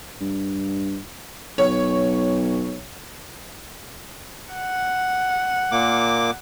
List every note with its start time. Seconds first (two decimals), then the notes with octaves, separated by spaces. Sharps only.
0.21 G2
1.58 B1 C#5
4.53 F#5
5.72 A#2 A#3 D6